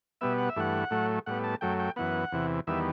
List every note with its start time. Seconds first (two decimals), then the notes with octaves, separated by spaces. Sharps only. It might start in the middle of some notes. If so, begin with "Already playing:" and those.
0.21 B2 G3 B3 E5
0.38 F#5
0.49 E5
0.56 G2 E3 A3 F#5
0.91 A2 F#3 A3
1.26 A2 G3 B3 F#5
1.44 A5
1.61 F#2 F#3 A3 G5
1.79 G5
1.96 F#2 E3 B3 F#5
2.32 E2 C3 E3
2.67 E2 D#3 G3 B3 E5